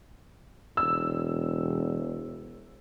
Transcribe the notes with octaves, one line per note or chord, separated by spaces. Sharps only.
E1 E6